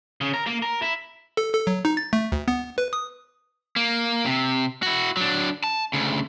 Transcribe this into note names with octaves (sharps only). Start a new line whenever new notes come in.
C#3
A#4
A#3
A#4
E4
A4
A4
F#3
D#4
A6
A3
D2
B3
B4
D#6
A#3
C3
E4 F#4
F#3 D4
A5
D2 C#3